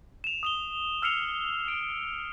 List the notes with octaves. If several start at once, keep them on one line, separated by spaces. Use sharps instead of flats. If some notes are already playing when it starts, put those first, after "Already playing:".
E7 F7
D#6 F7 G7
E6 F6 C7 C#7 F7
D7